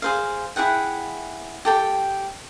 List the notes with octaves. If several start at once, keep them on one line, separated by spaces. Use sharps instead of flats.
G#4 C5 F5
E4 G#4 F#5 G5
G4 A4 G5